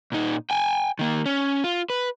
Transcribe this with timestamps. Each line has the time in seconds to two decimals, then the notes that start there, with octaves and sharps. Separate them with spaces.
0.12 A#2 D#4
0.50 G5 G#5
0.99 D#3 A#3
1.26 C#4
1.64 F4
1.90 B4